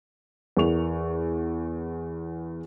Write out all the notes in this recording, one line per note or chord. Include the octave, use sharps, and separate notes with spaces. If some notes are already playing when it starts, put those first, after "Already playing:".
E2 A#4 C#6 F7